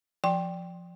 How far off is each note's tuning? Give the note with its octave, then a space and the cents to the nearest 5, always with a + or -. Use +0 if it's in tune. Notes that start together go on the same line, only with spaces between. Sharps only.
F3 +0 G5 +0 C6 +25